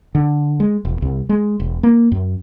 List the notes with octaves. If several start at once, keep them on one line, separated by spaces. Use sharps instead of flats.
D3
G#3
E1
C2
G#3
E1
A#3
F#2